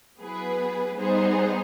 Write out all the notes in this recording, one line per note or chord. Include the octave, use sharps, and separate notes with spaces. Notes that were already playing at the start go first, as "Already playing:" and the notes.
F#3 B3 E4 G#4 B4
G3 B3 D#4 G#4 C5